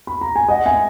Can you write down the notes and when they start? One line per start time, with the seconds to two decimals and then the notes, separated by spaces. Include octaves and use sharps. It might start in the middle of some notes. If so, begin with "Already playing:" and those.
0.07 B5
0.21 A#5
0.36 G#5
0.49 D#5 F#5
0.66 E5 G#5